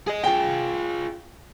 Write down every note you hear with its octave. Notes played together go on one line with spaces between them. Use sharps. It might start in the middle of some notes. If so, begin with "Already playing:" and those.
G#4 D#5
F4 G#4 G5